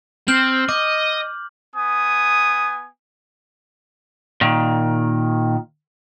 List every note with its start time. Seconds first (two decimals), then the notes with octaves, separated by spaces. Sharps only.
0.28 C4 F6 G6 F#7
0.69 D#5 D6
1.76 B3 G#5 D#6
4.41 A#2 D#3